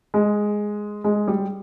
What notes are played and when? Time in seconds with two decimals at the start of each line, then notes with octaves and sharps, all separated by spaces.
0.14 G#3
1.04 G#3
1.28 G3